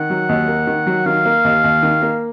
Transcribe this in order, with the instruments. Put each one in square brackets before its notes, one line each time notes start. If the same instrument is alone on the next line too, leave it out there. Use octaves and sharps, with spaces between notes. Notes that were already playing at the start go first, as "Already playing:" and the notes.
Already playing: [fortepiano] D#3 [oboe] F#5
[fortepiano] F#3
D#2
A#3
D#3
F#3
[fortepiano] D#3 [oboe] F5
[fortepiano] A#3
D#2
D#2
D#3
A#3